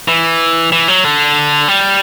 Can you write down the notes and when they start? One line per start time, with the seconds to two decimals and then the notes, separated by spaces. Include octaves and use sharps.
0.08 E3
0.72 E3
0.88 F#3
1.04 D3
1.68 G3